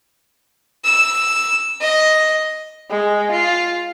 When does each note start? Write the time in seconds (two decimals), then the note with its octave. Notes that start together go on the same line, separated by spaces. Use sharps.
0.85 E6
1.81 D#5
2.89 G#3
3.32 F4